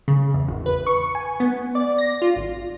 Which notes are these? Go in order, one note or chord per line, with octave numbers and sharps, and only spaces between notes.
C#3
E2
G#1
B4
C#6
G#5
B3
D5
A#6
F4
G#1